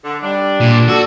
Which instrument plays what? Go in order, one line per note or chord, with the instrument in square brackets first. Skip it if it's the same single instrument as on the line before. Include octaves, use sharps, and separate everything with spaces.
[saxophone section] D3
[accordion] G3 [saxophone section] D4
[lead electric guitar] A#2
[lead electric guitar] F#4 [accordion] A4 D5